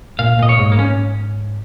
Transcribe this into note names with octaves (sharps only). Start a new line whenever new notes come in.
A#2 F5
A#2 D#5
C#5
G#2
A#3
C#4